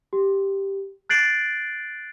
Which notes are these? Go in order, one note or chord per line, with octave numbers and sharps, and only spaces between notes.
G4
F#6 G6 A6 C7 D7 F#7